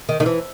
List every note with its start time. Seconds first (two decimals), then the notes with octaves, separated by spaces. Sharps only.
0.09 D#3
0.20 D#3
0.26 E3